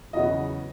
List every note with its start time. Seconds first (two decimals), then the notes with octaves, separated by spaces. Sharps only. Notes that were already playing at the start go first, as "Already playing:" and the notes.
0.13 E2 C#3 F#3 B3 D#5